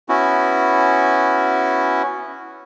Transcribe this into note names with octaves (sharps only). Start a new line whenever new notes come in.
B3 C#4 E4 F#4